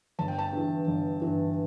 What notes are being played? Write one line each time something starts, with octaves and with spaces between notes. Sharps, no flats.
G1 A5
G5
A5
G2 E3
G1
E3
G2